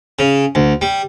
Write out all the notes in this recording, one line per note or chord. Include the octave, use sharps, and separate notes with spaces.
C#3
D2
G3